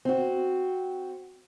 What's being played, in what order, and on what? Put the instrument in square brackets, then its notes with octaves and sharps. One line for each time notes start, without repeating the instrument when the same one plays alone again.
[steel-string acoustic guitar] C4 F#4